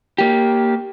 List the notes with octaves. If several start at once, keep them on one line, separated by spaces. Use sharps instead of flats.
A#3 G4